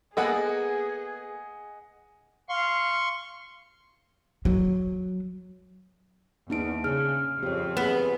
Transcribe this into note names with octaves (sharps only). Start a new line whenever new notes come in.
A#3 B3 G#4 A4 D#5 F#5 G#5
F5 C6 C#6
F#3
E2 A#3 D4 D#4 D7
C#3 G#4 F6
F2 C4 G4 C#5
A#3 B3 G#4